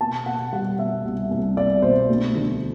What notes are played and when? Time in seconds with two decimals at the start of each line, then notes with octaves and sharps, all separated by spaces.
0.01 B2 A5
0.26 B2 F#5
0.53 G3 F#5
0.79 B2 E5
1.04 C2
1.31 C2
1.57 C2 D5
1.82 B2 C5
2.08 D2
2.35 D3